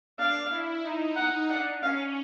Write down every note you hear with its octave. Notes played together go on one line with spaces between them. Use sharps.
D4 F5
E4
D#4
F#5
D4 F#5
C#4 F5